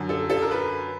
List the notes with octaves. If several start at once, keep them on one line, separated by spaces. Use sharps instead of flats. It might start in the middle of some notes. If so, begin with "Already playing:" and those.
Already playing: F#2 D3
A4
A4
A#4
B4